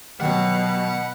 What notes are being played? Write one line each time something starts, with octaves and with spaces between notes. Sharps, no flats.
B2 D#3 F#3 G3 F#5